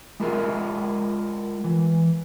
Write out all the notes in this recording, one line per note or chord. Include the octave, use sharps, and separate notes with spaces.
G#3 E4 F4 G#4 A#4 D#5
E3